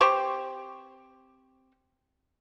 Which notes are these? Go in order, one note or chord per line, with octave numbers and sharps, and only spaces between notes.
C4 G4 C5 C#6